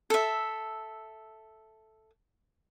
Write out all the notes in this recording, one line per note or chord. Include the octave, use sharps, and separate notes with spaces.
A4 E5